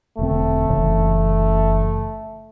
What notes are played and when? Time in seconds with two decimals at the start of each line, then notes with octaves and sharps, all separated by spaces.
0.19 E1 D3 A3 C4
0.69 F#1 C#3 E3